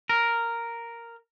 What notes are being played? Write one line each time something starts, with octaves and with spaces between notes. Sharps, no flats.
A#4